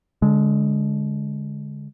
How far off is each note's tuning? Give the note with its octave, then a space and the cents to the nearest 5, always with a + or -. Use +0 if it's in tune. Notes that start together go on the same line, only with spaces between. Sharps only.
D3 -30 G#3 +0